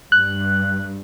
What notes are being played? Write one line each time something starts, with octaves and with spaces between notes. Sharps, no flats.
G2 F#6